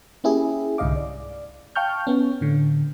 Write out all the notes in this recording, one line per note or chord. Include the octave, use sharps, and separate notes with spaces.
A#3 C#4 E4 G4 G#4
C2 G#2 D3 D#5 F5 D6
D5
F5 G5 A5 C#6 F6 G6
B3 C#4
A2 D3